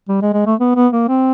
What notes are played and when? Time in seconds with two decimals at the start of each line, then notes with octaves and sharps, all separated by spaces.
0.08 G3
0.22 G#3
0.33 G#3
0.46 A3
0.59 B3
0.76 B3
0.93 A#3
1.08 C4